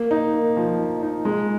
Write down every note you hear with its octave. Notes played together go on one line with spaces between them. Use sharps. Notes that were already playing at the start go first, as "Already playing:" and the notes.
Already playing: A#3
D#4
A#3
F3
D#4
D#4
G#3